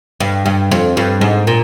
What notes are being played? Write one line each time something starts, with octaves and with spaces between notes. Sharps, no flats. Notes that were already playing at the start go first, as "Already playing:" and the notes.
G2
G2
F2
G2
G#2
A#2